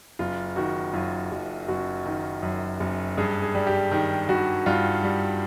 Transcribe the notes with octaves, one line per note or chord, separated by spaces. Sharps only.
F#1 F4
D#3 F#4
F#2 F4
F#1
F#1 F#4
D#3
F#2
F#1
G2 G#4
G#4
G3
G4
D#3
G2 F#4
G2 F4
G3